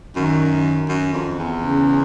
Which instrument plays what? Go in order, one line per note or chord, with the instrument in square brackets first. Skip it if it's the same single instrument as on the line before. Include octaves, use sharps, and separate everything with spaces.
[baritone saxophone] F#2 [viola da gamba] D#3
[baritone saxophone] F#2
F2
E2
[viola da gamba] C#3